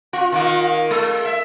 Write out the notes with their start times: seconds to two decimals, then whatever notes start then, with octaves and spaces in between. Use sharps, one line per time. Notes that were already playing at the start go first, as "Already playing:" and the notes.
0.13 F4
0.32 D#3 A#3 F4
0.91 G#3
1.25 E5